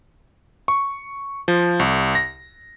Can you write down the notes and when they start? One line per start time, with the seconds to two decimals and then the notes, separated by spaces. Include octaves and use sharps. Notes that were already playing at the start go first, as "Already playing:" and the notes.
0.68 C#6
1.48 F3
1.79 C2
2.15 A#6